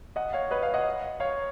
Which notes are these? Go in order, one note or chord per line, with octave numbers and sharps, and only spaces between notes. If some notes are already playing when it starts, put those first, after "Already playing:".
D#5 F#5
C#5 F5
B4 D#5
C#5 F5
D#5 F#5
C#5 F5